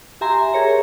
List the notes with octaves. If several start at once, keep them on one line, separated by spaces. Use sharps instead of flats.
G4 E5 G#5 A#5 C6
G#4 A#4 C#5 A#5